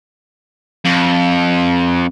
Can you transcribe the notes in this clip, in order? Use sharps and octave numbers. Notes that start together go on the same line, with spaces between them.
F2